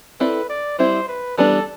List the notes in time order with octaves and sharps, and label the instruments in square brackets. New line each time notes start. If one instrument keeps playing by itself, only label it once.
[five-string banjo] C4 E4 A4 D5 [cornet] B4
[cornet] D5
[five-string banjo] G3 C4 E4 [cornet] C5
[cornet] B4
[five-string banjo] E3 G3 B3 D4 [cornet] A4